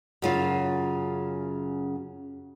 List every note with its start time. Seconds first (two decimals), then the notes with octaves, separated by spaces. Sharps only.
0.22 F#2 C#3 F4